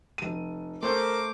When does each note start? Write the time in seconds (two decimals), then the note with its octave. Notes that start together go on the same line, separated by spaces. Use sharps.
0.18 F1 D#7
0.83 A3 A#4 C5 C6 D6 G6